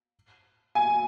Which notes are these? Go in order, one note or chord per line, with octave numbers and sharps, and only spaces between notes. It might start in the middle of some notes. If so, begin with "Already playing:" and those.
G#5